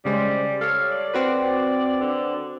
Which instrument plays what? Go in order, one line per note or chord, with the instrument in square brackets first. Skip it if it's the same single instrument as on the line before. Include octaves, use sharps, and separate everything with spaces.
[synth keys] C#3 G#3 C5 [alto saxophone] G3
[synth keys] A4 C#5 [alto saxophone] F5
[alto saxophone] D5
[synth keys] C4 F#4 B4
[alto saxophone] D3